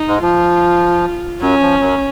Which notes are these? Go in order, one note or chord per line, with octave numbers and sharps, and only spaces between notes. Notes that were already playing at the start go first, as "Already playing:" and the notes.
Already playing: D#4
G#2 G#3
F3 F4
F#2 F#3 C#4
F3
F#2 F#3